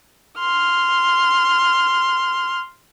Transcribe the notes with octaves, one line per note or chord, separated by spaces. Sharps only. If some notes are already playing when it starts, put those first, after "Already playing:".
C6 F6